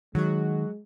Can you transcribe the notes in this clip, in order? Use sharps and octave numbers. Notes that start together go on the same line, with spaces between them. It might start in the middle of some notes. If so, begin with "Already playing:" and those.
D#3 F#3 G#3 F#4